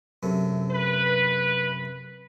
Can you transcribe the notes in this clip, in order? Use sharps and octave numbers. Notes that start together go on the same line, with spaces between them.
F#2 C3 A3
B4